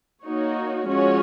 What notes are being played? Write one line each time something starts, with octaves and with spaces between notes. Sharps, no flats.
A#3 D#4 F#4 C#5
F3 G#3 C#4 F#4 C#5